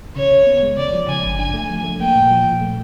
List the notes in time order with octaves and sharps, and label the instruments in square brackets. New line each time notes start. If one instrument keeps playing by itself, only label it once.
[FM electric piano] C#3 [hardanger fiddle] C#5
[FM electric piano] C#3
B3
G#3
[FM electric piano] C#3 [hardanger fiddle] D5
[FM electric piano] F3
[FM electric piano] C#3 [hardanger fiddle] G#5
[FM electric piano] G1
[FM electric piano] D4 [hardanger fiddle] G#5
[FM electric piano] A3
F3
A3
[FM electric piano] A#3 [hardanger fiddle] G5
[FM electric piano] A#2
F3
A#2
A3